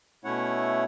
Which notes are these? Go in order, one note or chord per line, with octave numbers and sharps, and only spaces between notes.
B2 A3 C#4 E4 C#5 F#5